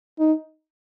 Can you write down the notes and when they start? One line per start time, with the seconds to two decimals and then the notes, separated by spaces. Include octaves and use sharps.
0.19 D#4